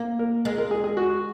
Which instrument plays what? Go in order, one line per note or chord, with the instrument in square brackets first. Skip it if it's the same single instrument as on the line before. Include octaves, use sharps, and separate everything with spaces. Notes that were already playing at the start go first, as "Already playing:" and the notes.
Already playing: [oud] A#3
[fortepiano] A#4
[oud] G#3 [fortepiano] A#4
[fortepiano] A#4
G#4
G#4
F#4